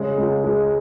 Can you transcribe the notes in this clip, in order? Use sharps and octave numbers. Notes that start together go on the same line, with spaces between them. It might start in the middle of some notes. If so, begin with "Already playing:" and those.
Already playing: C#3 G#3
C#2
G#3